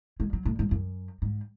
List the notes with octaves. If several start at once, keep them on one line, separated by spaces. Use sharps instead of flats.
G#3
F#3
A2
G#2
F#2
G#2